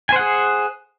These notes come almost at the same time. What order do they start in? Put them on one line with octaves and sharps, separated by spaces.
G#5 C5 F#5 G#4